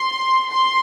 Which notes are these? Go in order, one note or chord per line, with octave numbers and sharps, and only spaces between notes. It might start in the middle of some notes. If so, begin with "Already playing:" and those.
Already playing: C6
C6